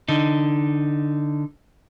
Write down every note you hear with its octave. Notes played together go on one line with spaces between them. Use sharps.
D3 D#4